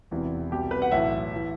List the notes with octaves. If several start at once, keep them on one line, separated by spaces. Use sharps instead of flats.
E1 E2 C3 E3
C2 B2 G4
B4
F#5
B1 A2 E3 E5
E3